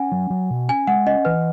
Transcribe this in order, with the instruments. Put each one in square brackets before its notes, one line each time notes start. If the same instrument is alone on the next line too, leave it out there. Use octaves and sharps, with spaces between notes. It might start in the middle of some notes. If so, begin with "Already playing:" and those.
Already playing: [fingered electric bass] C#4 [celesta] F#5 G#5
[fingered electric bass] F#3
F#3
B2
[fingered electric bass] C#4 [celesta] G#5
[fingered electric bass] G#3 [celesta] F#5
[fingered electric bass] C#4 [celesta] D#5
[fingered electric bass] E3 [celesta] B4